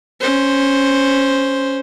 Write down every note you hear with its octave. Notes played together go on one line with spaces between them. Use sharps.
C#4 C5